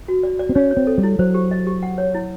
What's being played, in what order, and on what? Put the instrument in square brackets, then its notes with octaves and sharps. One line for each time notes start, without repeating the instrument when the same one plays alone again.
[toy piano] F#4
D5
D5
[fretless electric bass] C4
[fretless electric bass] C#4 [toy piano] C#5
[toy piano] C#5
[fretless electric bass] C4
[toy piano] A4
[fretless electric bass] G3
[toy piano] E4
[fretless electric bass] F#3 [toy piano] C5
[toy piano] G4
D#5
G4
F#5
C#5
E4